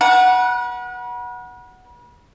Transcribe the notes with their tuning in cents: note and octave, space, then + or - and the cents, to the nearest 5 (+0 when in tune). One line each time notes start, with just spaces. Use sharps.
B4 -40 F#5 +0